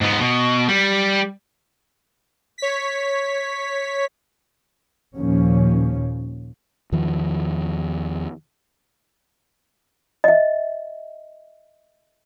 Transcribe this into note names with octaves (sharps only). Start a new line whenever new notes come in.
G#2 B3
B2
G3
C#5 B6
D#2 A#2 F3 C#4
E2 D#3 F3
D#5 E5